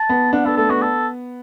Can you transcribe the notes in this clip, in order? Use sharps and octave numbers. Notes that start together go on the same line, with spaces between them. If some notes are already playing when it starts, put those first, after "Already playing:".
Already playing: A5
B3
D4 F#5
B3 A4
A3 A4
B3 F#4
A4